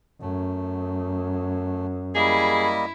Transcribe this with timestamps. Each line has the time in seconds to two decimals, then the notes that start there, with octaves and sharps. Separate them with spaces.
0.22 F#2 A3
2.15 G3 A#3 E4 G#4 D#5